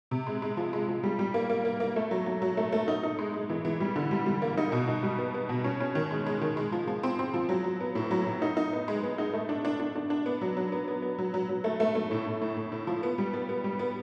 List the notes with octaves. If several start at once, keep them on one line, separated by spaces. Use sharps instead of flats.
C3
G#3
G#3
F3
G#3
F3
G3
G3
A#3
A#3
A#3
A#3
A3
F#3
F#3
F#3
A3
A3
D#4
D#4
G#3
G#3
E3
E3
G3
D3
G3
G3
A#3
D#4
B2
D#4
G3
B3
B3
B2
C#4
C#4
D#3
G#3
G#3
D#3
G#3
F3
F3
C4
C4
F3
F#3
F#3
B3
A2
F#3
A2
D#4
D#4
B3
G#3
B3
D#4
A3
D4
D4
D4
D4
D4
B3
F#3
F#3
B3
B3
B3
F#3
F#3
F#3
A3
A3
A3
A2
A2
A2
A2
A2
F3
B3
G3
B3
B3
G3
B3